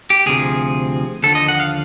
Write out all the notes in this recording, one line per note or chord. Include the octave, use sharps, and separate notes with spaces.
G4
D2 C3 F3 G#4
D#2 D3 F3 A4
D#5
F#5
F5